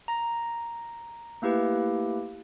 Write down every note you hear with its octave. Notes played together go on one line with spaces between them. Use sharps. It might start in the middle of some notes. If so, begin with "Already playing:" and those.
A#5 A#6
A3 A#3 E4 G4 B4